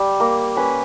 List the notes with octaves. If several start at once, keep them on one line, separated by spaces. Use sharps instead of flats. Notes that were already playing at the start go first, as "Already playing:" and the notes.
Already playing: G3
A#3
C#4 B4